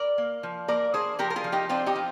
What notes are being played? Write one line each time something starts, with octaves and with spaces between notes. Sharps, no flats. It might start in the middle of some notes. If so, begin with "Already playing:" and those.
Already playing: A#4 D5
A#3
F3
A#3 A#4 D5
D4 G#4 C5
F3 G4 A#4
A#4
F4 G#4
F3
D#4 G4
C4 D4 F4
D#4 G4
F3